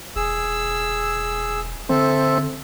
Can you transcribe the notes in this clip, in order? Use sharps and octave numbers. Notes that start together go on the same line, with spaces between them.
E1 G#4 E6
D3 C4 A4 E5